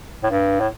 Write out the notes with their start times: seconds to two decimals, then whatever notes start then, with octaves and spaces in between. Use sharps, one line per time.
0.23 A2
0.30 G2
0.60 A2